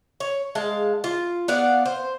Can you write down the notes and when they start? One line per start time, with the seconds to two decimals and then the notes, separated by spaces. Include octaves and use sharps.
0.20 C#5
0.55 G#3 F5 A5
1.04 F4
1.48 B3 D5 F5 F#5
1.86 C5